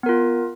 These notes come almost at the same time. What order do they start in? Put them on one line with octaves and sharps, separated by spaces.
B3 A#4 F4